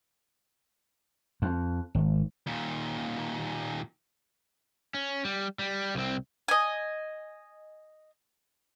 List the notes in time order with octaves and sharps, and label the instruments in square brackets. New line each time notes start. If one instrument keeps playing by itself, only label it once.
[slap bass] F2
G#1
[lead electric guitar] D#2 A#2
[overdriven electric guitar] C#4
G3
G3
C2 C4
[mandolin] D#5 G#5